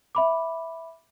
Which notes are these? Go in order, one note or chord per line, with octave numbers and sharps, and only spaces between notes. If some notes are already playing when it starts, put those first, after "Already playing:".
E5 B5 D6